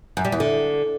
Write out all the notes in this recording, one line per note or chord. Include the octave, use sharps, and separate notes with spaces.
F#2
G3
E2
D3